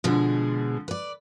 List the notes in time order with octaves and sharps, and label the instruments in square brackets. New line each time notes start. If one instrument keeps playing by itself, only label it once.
[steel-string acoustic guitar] B2 G#3 G#4 [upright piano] D3 F3
[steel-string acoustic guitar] B4 D5